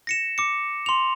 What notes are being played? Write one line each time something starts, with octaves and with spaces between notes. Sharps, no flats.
A#6 C#7 E7
D6 C#7
C6 F7